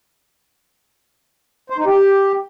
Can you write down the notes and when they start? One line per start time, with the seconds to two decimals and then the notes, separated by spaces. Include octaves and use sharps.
1.70 C5
1.78 D#4
1.86 G4